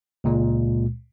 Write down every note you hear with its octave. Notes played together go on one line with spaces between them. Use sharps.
C#2 A#2 G#3